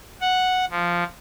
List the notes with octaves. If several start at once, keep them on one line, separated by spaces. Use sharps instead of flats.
F#5
F3